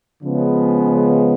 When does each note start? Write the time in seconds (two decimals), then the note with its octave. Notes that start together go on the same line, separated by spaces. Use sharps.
0.24 C#3 F3 G#3 B3